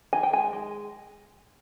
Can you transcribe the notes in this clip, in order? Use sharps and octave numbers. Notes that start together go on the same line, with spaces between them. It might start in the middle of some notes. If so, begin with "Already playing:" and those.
D#3 G#5
G5
G#3 G#5
G#3